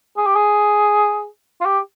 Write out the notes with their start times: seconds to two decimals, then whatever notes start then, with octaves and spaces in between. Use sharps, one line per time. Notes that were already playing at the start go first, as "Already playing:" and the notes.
0.17 G#4
0.26 G4
0.36 G#4
1.61 F4
1.65 G4